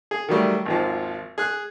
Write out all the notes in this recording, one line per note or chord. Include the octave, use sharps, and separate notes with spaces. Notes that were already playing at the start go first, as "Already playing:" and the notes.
G#4
D#3 F#3 G3 A3
G#1 D#2 F3
G#4 F#6